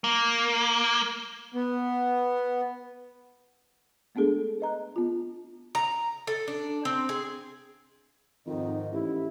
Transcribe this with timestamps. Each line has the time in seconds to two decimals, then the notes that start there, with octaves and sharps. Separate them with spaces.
0.04 A#3
1.54 B3
4.15 G#3 A3 B3 D4 G#4 A4
4.60 B4 D#5 A#5 F#6
4.96 B3 F4
5.75 A#5
6.27 A4
6.47 D4
6.85 C4
7.09 G#4
8.47 F2 G#2 D#3 D#5
8.92 A1 E4 G4